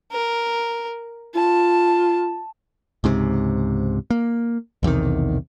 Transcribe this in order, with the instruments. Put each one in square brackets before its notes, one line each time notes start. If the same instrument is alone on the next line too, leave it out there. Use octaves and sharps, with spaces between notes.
[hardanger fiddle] A#4
[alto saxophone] F4 [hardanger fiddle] A5
[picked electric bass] C#2 G#2 C3
A#3
B1 E2 C3 D#3